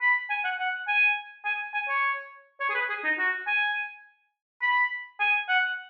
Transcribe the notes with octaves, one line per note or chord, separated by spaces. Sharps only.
B5
G#5
F#5
F#5
G#5
G#5
G#5
C#5
C#5
G#4
B4
G#4
D#4
F#4
G#5
B5
G#5
F#5